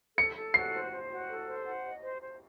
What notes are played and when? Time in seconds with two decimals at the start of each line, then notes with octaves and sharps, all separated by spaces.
0.18 A4 C#7
0.37 A4
0.54 F#4 C7
0.73 C5
0.92 C5
1.10 F#4
1.29 A4
1.48 C5
1.66 F#5
1.84 D#5
2.03 C5
2.21 C5